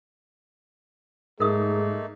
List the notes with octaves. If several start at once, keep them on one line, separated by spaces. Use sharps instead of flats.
G#2 A3 A#3 D#4 G#4 A#4 D#6